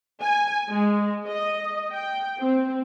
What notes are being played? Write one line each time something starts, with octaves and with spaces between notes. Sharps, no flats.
G#5
G#3
D#5
G5
C4